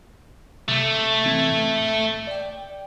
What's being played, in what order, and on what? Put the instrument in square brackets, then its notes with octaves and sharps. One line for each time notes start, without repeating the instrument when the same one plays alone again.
[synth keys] C3 [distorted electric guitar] A3
[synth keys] E3 C4 G#6
A2
D5 G5